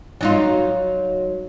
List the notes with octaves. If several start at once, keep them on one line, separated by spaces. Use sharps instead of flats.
F#3 D#4 F4